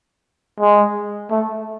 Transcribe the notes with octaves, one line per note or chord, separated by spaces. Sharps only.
G#3
A3